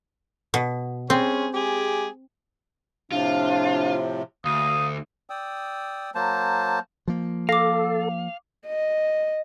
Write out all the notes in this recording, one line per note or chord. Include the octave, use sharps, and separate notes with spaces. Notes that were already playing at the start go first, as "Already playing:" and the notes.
B2
G3 C4 C#4 G#4
G#3 G4 G#4
A2 C3 F3 D4 F4
D2 F5 D#6
D5 G5 D#6 E6
F#3 A#3 C5 A5
F3 A#3
A4 F5 D6 A#6
D#5